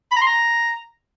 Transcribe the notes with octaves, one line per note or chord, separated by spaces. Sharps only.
B5
A#5
C6
A#5